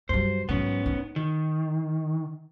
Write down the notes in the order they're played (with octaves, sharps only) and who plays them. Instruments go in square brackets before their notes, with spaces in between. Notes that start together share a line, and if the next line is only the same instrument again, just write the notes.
[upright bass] G2 F#3 [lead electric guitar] C5
[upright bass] G#2 F#3 [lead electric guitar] B3 C#4
[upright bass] D#4
[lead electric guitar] D#3